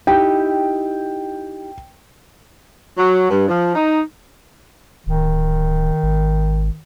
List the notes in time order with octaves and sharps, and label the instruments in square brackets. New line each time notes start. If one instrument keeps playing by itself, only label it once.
[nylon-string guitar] D#4 E4 G4 [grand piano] G5
[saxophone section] F#3
G2
F3
D#4
[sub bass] D1 [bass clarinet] D#3
[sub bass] G#1